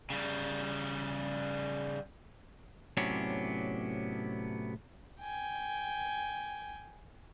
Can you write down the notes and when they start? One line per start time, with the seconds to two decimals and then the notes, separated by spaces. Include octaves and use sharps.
0.10 C#3 G3
2.97 A2 C3 F#3 B3 C#4 D4
5.20 G5 G#5